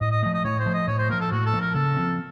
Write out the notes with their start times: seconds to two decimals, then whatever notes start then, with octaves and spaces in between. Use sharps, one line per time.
0.01 A2 D#5
0.12 D#5
0.23 A3 D#5
0.26 F3
0.34 D#5
0.44 A2 C#5
0.59 C5
0.66 F3 A3
0.74 D#5
0.87 A2 C#5
0.98 C5
1.10 F3 A#3 A#4
1.20 A4
1.31 A2 F#4
1.46 A4
1.54 F3 A#3
1.60 A#4
1.74 C#3 A4
1.97 F3 C4